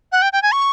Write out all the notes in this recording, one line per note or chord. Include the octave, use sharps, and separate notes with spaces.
F#5
G5
G5
G#5
C#6